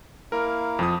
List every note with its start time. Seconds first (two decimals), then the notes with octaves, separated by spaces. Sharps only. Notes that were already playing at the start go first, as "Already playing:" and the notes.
0.32 A#3 E4 A#4 F5
0.79 F2 F3 D#6